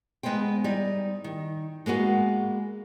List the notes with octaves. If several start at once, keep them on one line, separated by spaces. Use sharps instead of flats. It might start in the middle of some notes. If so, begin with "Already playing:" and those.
G#3 B3 D#4 C5 G5
G3 D#4
D#3
G#3 A#3 B3 F#4